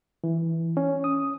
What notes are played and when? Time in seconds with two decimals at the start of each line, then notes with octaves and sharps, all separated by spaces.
0.24 E3
0.77 C#4
1.04 D#6